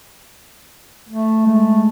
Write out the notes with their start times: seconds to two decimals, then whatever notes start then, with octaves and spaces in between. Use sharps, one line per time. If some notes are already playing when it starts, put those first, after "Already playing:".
1.09 A3
1.47 G#3 A3